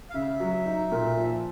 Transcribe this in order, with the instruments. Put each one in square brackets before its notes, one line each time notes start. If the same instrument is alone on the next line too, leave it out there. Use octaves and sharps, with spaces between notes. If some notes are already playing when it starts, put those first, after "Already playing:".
[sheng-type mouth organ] F5
[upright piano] C#3 [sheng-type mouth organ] E5
[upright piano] F#3
D#4
A#2
F3